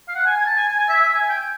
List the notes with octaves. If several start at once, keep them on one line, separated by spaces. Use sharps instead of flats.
F5
F#5
G#5
G#5
A5
G#5
G#5
G#5
E5
E5
G#5
G5